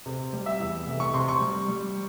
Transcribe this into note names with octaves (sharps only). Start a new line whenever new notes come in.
C3
G3
E5
E2
F1
C#6
C3 C6
C#6
G3
G3